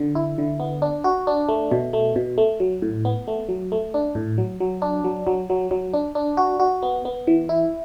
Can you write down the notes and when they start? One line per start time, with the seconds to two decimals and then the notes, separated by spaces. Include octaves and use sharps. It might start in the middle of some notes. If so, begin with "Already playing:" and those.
Already playing: D3
0.15 E4
0.38 D3
0.60 B3
0.82 D4
1.04 F#4
1.27 D4
1.49 A3
1.71 B2
1.93 A3
2.16 B2
2.38 A3
2.60 F#3
2.82 A2
3.05 B3
3.27 A3
3.49 F#3
3.72 A3
3.94 D4
4.15 A2
4.38 F#3
4.60 F#3
4.82 D4
5.04 F#3
5.27 F#3
5.50 F#3
5.71 F#3
5.93 D4
6.15 D4
6.37 F#4
6.60 F#4
6.83 B3
7.05 B3
7.27 E3
7.49 E4